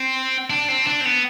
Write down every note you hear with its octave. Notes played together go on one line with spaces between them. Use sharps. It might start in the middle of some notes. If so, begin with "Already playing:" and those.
Already playing: C4
D4
C4
D4
C4
B3